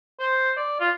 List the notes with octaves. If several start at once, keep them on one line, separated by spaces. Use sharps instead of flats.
C5
D5
F4